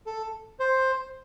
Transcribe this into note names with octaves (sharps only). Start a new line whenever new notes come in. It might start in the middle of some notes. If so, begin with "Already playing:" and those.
A4
C5